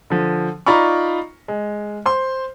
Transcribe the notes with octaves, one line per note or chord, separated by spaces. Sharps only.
D3 F3
D#4 F4 D5 A#5 B5 C#6
G#3
C5 C6